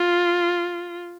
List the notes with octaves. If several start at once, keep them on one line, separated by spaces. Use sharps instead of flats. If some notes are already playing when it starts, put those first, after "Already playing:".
Already playing: F4